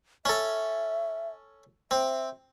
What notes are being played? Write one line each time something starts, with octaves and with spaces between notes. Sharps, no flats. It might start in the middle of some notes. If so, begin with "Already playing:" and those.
C#4 A4 E5
C4 E5